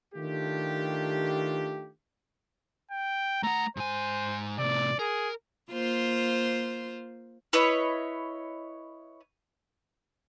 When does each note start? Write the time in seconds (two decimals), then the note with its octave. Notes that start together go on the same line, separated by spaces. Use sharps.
0.14 D#3 A3 D4 F4 G4
2.91 G5
3.43 A3 F#5 A#5
3.77 G#2 C5 G#5
4.59 A2 C3 D5
4.99 G#4 A#4
5.71 A#3 F4 C5
7.53 E4 B4 C#5 D#5